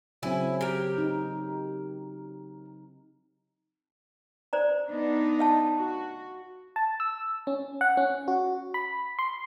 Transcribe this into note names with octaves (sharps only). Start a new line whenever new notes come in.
C#3 F#3 C4 E4 E5 G#5
G4 A#4
D#4
C5 D5 A#5
B3 D4 D#4
D#5 F5 A5
F#4
A5
E6
C#4
F#5
C#4
F#4
B5
C6